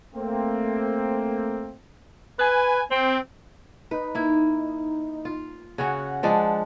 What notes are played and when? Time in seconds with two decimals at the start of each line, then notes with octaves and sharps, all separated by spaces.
0.15 A3 A#3 C4
2.39 B4 G#5
2.90 C4
3.91 D#4 B4
4.15 A#3 E4
5.25 F4
5.78 C#3 C#4 F#4 F#5
6.23 F3 G#3 D4